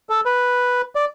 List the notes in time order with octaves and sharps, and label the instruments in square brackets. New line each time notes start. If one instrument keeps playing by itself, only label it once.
[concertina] A4
B4
D5